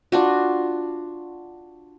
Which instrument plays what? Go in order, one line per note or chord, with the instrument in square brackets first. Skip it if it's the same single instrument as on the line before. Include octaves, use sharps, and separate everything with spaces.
[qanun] D4 F4 F#4